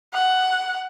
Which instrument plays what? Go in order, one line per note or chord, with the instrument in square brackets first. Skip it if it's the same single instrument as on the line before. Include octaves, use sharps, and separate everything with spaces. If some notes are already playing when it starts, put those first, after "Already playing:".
[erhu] F#5